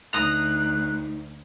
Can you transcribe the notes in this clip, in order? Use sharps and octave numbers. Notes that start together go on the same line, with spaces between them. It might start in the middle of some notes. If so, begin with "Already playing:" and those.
D2 D#4 A#5 D#6 F#6